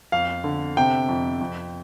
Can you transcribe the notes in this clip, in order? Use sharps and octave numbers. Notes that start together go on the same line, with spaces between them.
F2 F5
D3
C3 G5
F2
F2